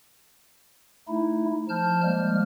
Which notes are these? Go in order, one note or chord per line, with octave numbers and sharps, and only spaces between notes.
A3 D#4 E4
F3 A5 F6 G6
F3 G3 G#3 A#3 F6